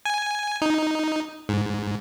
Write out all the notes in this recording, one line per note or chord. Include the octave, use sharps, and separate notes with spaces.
G#5
D#4
G#2